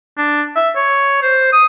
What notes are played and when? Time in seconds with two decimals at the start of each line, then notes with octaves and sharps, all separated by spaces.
0.17 D4
0.56 E5
0.76 C#5
1.22 C5
1.52 D#6